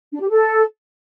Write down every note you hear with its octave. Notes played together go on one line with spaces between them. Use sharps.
D4
G4
A4